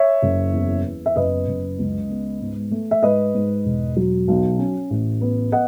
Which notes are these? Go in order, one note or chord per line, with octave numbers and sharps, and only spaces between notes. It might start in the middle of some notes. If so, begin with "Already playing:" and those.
Already playing: C#5 E5
F#1
E2
B3
E5
F#1 B4 D#5
F#1
C#2
B3
G#2
A3
E5
G#2 B4 D#5
G#2
E1
F#3
B1
C#4
A1
B3
D#5 F#5